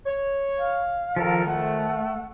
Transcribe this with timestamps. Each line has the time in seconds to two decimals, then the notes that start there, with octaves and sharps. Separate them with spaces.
0.06 C#5
0.58 F5
1.16 F2 G#2 D#3 F3 A4 A#4
1.47 A3 F#5